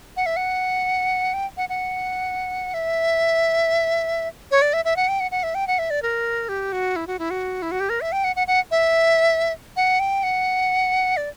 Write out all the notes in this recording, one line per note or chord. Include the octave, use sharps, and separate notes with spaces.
F#5
E5
F#5
G5
F#5
F#5
E5
C#5
D5
E5
E5
F#5
G5
F#5
F#5
E5
G5
F#5
E5
D5
A#4
G4
F#4
E4
F#4
E4
F#4
E4
F#4
G4
A#4
E5
G5
F#5
F#5
F#5
E5
F#5
G5
F#5
D5